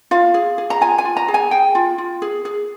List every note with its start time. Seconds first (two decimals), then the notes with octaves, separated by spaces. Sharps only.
0.11 F4 F5
0.34 G#4
0.58 G#4
0.70 A#5
0.81 F4 G#5
0.98 G#5
1.05 F4
1.17 A#5
1.28 G#4
1.34 G#5
1.51 G#4 G5
1.75 F4
1.98 F4
2.22 G#4
2.45 G#4